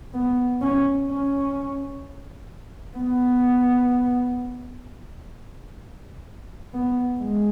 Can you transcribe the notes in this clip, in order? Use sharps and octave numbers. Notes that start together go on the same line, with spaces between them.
B3
C#4
C#4
B3
B3
G#3